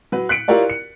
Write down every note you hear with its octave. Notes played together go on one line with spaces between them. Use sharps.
F#3 B4
F#6 B6 C#7 D7
E4 F4 G4 A#4 C#5 D5
C#7